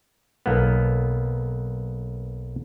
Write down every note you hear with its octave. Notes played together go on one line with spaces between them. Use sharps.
B1 A#3 B3